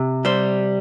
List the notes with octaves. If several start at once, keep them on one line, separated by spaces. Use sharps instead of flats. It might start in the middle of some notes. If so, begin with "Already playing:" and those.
Already playing: C3
G3 C5